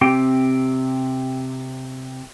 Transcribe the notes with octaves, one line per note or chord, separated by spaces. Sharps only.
C3 C4 G4 G5